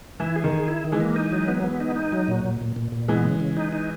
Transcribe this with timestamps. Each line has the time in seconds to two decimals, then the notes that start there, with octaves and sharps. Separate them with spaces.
0.20 E3 E4
0.36 G#4
0.44 D#3
0.52 G#4
0.68 E4
0.85 D#3
0.92 E3 G#3
1.00 A#3
1.16 D#4
1.32 F#3
1.48 B3
1.64 B3
1.80 D#4
1.96 D#4
2.12 F#3
2.28 A#2
2.44 A#2
2.61 A#2
2.76 A#2
2.92 A#2
3.08 E3 G#3 B3
3.24 C#3
3.40 C#3
3.57 D#4
3.73 D#4